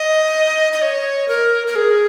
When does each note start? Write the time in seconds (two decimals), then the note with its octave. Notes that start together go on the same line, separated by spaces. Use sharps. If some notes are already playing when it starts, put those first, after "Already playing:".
Already playing: D#5
0.73 D#5
0.82 C#5
1.28 A#4
1.67 A#4
1.76 G#4